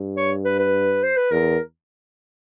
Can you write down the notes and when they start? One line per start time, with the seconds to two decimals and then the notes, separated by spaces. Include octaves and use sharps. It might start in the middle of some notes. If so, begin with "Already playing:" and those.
Already playing: G2
0.17 C#5
0.45 B4
0.59 B4
1.03 C5
1.16 B4
1.31 E2 A#4